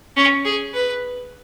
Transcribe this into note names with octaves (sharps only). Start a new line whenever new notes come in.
C#4
G#4
B4